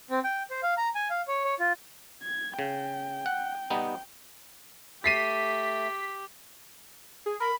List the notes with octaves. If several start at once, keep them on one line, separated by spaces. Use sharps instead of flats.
C4
G5
C5
F5
A#5
G#5
F5
C#5
C#5
F4
G#6
C#3 G5
F#5
G3 B3 D#4
A3 G4 A6 B6 C7 D#7
G#4
A#4 B5